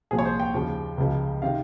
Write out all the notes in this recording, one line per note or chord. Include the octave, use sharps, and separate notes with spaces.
C2 A#2 F3 G#4
C#5
C5
G5
D#2 C#3 F3
C#2 C#3 F3
C3 D#3 F5